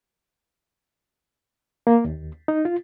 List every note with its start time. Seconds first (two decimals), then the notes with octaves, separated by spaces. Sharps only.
1.87 A#3
2.05 D#2
2.48 D#4
2.65 F4